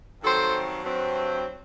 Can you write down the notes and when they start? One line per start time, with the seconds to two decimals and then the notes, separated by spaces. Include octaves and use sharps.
0.22 G2 D#3 F#3 C4 A4 C5
0.84 G2 F#3 C4